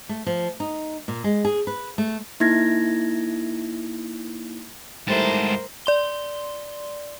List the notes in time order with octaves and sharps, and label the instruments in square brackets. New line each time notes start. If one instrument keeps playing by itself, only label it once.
[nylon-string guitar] A3
F3
D#4
A#2
G#3
G#4
B4
A3
[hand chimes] A#3 D#4 E4 G#6 A#6
[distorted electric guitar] G#2 A5 [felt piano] G3 A3 E4 [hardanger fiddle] A#4 C5
[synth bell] D5 C6 G7